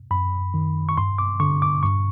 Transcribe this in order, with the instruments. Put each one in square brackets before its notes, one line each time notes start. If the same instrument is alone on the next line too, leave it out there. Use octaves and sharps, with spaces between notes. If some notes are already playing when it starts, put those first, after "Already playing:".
[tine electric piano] F#2 B5
D#3
C#6
G2 C6
D6
D3 C#6
D6
G2 C#6